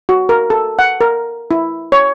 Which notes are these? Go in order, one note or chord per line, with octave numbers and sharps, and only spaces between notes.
F#4
A#4
A4
F#5
A#4
E4
C#5